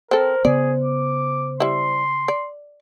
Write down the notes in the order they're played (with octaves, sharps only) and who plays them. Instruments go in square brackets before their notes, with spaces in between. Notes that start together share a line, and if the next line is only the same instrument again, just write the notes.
[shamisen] C4 A4 [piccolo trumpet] A#4 [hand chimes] C5
[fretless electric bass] C#3 B3 [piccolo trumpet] G#4 [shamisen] D5
[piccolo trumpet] D6
[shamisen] G3 E4 [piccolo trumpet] C6
[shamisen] D5